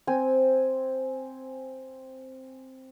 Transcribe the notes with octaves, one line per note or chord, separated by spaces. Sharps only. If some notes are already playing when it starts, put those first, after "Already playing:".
C4 G#5